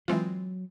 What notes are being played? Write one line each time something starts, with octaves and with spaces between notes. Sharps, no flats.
E3 F#3 G#3 C4 F4